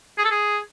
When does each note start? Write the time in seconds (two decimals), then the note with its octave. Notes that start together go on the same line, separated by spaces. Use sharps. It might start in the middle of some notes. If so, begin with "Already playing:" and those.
0.18 G#4
0.25 A4
0.31 G#4